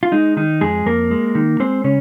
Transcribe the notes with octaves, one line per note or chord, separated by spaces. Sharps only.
F4
G#3 D#4
D#3 D#4
F2 G#3 G#4
F2 A#3 A#4
G#3
D#3
G#3 C4 C5
C#3 C#4 C#5